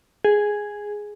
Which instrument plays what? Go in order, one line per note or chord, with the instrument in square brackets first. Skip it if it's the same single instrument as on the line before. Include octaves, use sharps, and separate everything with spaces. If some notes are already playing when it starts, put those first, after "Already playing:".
[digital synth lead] G#4